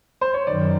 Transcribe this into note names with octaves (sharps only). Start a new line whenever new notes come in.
C5
C#5
F#2 D#3 D5